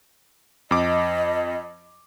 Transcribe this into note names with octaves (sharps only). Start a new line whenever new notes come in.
F2 D#5 D6